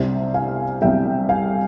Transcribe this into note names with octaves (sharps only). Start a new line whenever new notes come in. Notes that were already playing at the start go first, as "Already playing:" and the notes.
Already playing: C2 C3 G3 C5 E5
F5 G#5
C2 C3 G3 E5 G5
F5 G#5